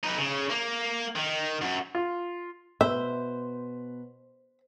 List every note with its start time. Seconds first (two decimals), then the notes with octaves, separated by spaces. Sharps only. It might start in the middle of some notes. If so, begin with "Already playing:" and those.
0.04 D#4 B4
0.18 C#3
0.50 A#3
1.16 D#3
1.62 F#2
1.95 F4
2.81 B2 B4 C5 E5